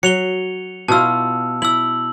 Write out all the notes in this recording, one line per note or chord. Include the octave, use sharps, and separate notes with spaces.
F#3 C#7 F7 G7
B2 E4 F4 A5 E6
E4 E6 F#7